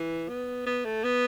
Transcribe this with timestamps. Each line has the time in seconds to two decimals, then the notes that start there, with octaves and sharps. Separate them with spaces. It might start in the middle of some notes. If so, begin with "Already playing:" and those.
Already playing: E3
0.29 B3
0.66 B3
0.85 A3
1.04 B3